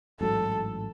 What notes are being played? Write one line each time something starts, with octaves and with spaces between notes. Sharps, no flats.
A1 G#2 F#3 A4